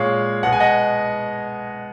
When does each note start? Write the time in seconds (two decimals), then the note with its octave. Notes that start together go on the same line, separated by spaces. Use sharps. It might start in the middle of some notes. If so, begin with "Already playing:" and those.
Already playing: A#2 G#3 C#5 F5
0.43 B2 G#3 F#5
0.52 G#5
0.60 D#5 F#5